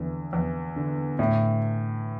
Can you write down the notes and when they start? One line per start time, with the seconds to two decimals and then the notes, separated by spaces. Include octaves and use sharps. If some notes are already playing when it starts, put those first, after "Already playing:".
Already playing: E2 D3
0.33 E2
0.76 D3
1.19 A2